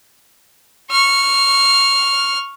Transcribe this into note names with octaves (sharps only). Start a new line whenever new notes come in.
C#6 F6